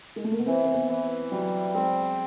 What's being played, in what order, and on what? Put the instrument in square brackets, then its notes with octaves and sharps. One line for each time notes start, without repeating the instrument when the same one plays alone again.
[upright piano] G#3
A3
A#3
B3
[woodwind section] E3 [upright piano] C4
[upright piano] C4
B3
[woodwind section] E3
[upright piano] F#3 [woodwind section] G3
[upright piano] G#3 [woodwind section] C4